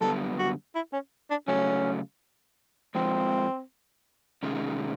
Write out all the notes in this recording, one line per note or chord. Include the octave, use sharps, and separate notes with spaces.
F#2 D3 G3 B3 A4
F#4
E4
C#4
D4
C#3 F#3 A3 C#4
F2 C#3 F3 G#3 C4
C3 D#3 G#3 C#4